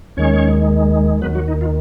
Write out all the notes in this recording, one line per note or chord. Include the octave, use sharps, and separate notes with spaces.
D#2 D#3 G#3 C#4 C#5
D#2 D#3 F#3 B3 B4
F#3 F#4
D#4
F4